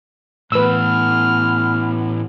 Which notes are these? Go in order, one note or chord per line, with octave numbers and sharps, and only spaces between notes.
A2 E3 B3 B4 E6 F6